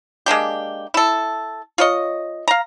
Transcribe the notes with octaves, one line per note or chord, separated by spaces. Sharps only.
G#3 A#3 D4 G4
E4 A4
F4 C#5 D#5
F5 A#5